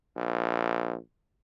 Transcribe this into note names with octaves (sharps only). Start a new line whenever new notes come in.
A#1